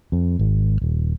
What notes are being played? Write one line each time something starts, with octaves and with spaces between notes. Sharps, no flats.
F2
G#1
D#1